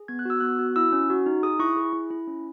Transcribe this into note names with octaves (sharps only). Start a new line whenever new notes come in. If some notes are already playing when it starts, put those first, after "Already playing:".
Already playing: G#4
B3 G#6
F#6
F#4 E6
B3 F#6
F#4
E4 E6
C#4
F#4
D#4
G#4 D#6
E4 C#6
G#4
E4
E4
C#4